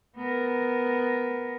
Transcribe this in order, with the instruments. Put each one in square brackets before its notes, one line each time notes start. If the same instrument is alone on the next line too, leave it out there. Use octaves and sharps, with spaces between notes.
[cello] B3 A#4